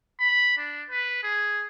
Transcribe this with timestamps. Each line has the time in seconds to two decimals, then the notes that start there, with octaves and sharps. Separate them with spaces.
0.20 B5
0.58 D4
0.90 B4
1.24 G#4